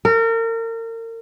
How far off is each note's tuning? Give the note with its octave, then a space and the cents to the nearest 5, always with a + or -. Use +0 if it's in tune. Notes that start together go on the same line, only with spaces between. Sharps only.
A#4 -35